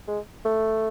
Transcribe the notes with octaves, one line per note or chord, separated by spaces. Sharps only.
G#3
A3